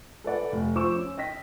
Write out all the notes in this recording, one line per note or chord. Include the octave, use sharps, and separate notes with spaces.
A4 B4 D5 F#5
F1
F3 C5 C#6 D6 E6 E7
C#4
D#5 G5 A#6 B6